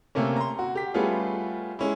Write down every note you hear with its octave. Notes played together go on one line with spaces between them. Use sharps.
C3 A3 A#3 C#4
A#5 C6
F#4
G4 B6
G3 A3 B3 C#4 F4 G#4
G#3 C#4 E4